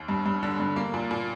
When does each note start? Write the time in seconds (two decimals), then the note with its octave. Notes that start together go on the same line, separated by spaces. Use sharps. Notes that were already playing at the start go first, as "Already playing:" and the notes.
Already playing: D#2
0.08 G2
0.26 G2
0.43 D3
0.60 G2
0.76 A#3
0.94 A#2
1.11 A#2